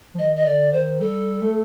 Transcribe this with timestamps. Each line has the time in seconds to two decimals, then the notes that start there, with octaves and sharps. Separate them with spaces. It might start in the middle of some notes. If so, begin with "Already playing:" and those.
0.15 F3
0.19 D#3 D#5
0.36 D#5
0.46 D3 D5
0.73 D#3 C5
1.00 G3 A4
1.42 A3